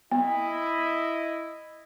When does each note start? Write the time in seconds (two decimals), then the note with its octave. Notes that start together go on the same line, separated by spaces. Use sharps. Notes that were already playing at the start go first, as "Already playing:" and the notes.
0.12 B3 E4 D#5